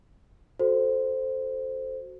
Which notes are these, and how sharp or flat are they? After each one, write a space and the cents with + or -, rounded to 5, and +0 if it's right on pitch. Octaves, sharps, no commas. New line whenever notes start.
F#4 +0 A4 +0 C5 +0